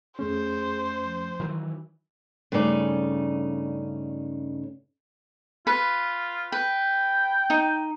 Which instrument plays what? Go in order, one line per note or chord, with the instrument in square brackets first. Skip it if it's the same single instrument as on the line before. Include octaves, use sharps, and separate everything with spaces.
[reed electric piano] F2 A3 C#4 [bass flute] G#4 [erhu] C5
[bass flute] F3
[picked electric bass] D#3 E3 F#3
[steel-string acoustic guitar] G2 C#3 A3 C#4 D#4 D5
[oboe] F4 [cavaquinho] B4
[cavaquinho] B4 [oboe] G5
[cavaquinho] D#4